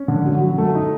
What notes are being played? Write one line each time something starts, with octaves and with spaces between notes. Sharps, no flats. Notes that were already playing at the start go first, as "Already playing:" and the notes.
Already playing: C#4
D3
F#3
F#3
A3
D#4